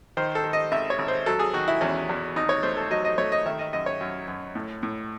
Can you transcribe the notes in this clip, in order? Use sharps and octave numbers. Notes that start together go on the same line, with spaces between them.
D#3 C5
A4
D#3
D#5
G#1 E5
C#5
G#1
C5
F#3 A4
G#4
D#3 F#4
E4
E2 C#4
E2
G#1 D#4
C#5
A3 C5
A4
F#3 D#5
D#5
A3 C#5
D#5
D#3 E5
D#5
F#2 D#5
C#5
F#2
F#2
A2
A2